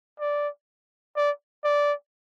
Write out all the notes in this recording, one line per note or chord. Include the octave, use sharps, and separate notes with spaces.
D5
D5
D5